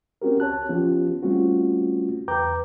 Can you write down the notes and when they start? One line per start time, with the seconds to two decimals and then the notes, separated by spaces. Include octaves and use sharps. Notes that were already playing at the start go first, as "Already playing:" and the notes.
0.22 C4 C#4 F#4 G4 A#4
0.40 C#2 C#5 A5 F#6
0.69 F3 B3 C#4 F4 G4
1.23 G3 A3 C4 C#4 F4 F#4
2.28 E2 B4 G5 A#5 D6 G6